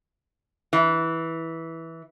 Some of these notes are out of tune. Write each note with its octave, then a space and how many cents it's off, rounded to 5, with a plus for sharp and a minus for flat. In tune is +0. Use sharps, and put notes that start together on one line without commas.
E3 -10